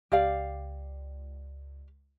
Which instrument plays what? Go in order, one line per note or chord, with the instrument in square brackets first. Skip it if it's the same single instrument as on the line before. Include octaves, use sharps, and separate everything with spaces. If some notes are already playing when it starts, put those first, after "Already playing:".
[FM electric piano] C#2 [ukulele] G4 D5 F5